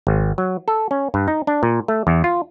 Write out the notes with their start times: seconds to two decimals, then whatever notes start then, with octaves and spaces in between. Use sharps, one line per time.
0.07 G#1
0.38 F#3
0.68 A4
0.91 C#4
1.14 G2
1.28 D#4
1.47 D4
1.63 A#2
1.88 A3
2.07 E2
2.24 F4